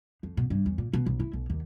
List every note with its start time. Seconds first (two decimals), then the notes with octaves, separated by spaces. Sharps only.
0.23 F2
0.37 B2
0.50 G2
0.66 E2
0.78 A#2
0.93 B2
1.06 B1
1.20 E4
1.33 B1
1.50 D#2